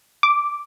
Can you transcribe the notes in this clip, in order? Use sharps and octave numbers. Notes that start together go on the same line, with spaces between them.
D6